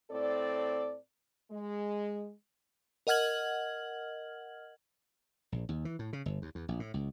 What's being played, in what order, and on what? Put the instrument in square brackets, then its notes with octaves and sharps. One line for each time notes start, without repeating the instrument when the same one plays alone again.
[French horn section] A2 C4 A4 D5
G#3
[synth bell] A#4 D#5 F#5 F6 G#6 F#7
[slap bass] A#1
D#2
E3
A2
C#3
G1
D#2
E2
A#1
A2
C#2